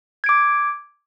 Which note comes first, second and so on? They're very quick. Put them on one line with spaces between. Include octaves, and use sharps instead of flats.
G#6 D7 D6